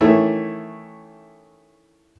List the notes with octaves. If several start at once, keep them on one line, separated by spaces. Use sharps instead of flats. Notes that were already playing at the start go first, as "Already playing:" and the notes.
D#3 E3 A3 C#4 E4